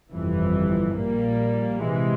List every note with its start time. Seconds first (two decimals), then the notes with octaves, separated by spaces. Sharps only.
0.11 G1 F2 C3 E3
0.97 A#1 A#2 G3 A#3
1.84 C3 E3 G#3